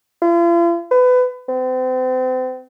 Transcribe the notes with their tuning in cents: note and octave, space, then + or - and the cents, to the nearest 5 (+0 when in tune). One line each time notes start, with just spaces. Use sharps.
F4 -45
B4 +25
C4 -35